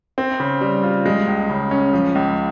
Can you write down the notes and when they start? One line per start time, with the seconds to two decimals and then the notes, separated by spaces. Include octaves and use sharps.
0.18 C4
0.40 C#3
0.61 G3
0.84 F4
1.06 G#3
1.28 C#2
1.50 C#3
1.71 C#4
1.93 F3
2.15 C#2